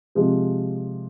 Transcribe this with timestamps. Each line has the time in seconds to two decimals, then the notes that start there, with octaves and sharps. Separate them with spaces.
0.15 C3 F3 G#3